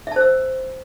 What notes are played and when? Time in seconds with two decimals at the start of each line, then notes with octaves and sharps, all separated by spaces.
0.07 E5
0.12 A5
0.16 C5
0.21 E6